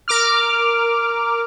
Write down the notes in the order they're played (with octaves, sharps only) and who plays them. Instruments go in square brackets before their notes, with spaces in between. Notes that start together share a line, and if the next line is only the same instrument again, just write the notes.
[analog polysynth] A#4 D6 F6